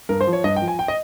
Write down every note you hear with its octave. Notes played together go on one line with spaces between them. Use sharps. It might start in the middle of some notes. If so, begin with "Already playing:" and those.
G2 A#4
C5
F3
C#5
G2 D#5
G5
F3
G#5
G5
D#5